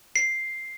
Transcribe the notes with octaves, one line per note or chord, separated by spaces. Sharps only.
C7